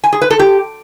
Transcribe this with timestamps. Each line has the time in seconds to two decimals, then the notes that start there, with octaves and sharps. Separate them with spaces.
0.04 G#5
0.13 G#4
0.22 B4
0.30 A4
0.39 G4